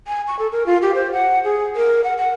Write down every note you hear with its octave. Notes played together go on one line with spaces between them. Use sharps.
G#5
C#6
A4
A#4
F4
G4
C5
F#5
G#4
A#4
F#5
F#5